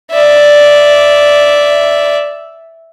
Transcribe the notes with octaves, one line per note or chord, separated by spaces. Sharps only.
D5 E5